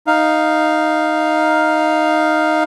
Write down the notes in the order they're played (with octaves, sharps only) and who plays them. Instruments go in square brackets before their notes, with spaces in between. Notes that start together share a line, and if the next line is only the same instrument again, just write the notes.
[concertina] D#4 F5